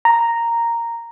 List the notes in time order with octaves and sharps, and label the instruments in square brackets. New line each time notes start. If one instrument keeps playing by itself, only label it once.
[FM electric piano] A#5